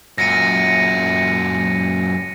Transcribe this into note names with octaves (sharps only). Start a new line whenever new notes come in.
F#2 A#2 A#6 C#7 D#7